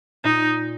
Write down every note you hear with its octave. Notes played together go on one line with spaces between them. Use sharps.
A#2 D#4